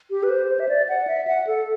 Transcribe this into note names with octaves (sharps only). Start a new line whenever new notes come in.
G4
B4
C5
C5
E5
D5
F#5
E5
F#5
A4